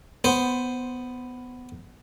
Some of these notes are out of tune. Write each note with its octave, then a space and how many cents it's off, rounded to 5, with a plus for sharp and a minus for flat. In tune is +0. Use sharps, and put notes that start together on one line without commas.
B3 +10 C5 +0